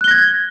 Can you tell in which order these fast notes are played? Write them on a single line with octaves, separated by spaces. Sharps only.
F#6 G7 A#6 G#6